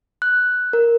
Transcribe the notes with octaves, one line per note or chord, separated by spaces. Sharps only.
F#6
A#4